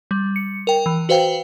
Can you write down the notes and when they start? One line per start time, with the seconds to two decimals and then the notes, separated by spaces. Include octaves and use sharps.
0.11 G3
0.36 C#7
0.67 A#4 G5
0.86 E3
1.09 F#4 B4 C5 F5 G5